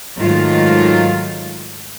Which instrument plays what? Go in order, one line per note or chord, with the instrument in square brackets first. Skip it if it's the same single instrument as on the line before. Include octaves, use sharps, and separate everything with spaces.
[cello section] G#2 D#3 F#3 A3 F4